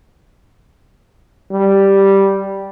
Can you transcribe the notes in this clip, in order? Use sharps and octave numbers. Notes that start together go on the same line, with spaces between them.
G3